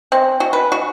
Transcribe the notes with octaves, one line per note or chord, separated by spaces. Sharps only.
C4
F#4
B4
F#4